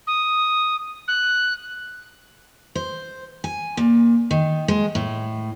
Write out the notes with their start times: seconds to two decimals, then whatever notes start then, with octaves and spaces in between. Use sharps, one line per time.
0.07 D#6
1.08 F#6
2.75 C5
3.44 G#5
3.77 A#2
4.31 D#3
4.68 G#3
4.95 A2